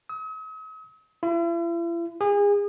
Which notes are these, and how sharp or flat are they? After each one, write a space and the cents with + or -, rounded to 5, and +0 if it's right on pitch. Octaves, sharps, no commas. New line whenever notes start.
D#6 +45
E4 +45
G#4 -30